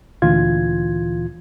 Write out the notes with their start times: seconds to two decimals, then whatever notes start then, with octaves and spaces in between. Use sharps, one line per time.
0.22 D2 A#2 E3 F4 G#6